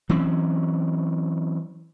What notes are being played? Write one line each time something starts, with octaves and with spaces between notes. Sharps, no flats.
E3 F#3 C4 C#4